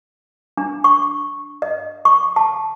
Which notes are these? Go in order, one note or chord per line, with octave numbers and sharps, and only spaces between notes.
D4
C#6
D#5
C#6
A5